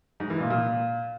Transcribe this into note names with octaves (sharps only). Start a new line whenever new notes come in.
G#2
E3
A#2
A#2